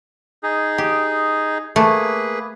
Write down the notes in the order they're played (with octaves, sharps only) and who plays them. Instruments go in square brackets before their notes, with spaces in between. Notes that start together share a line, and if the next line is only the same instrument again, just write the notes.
[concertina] D#4 G#4
[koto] G4
[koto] A3 [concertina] A#3 G#4 B4